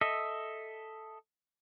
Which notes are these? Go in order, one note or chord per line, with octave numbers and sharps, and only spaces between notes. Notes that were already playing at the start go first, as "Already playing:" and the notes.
A4 D#5 E5